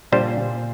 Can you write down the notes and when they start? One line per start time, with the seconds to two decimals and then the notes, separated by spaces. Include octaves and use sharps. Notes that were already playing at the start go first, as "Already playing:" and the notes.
0.12 A#2 G3 D4 G4 C5
0.37 A#2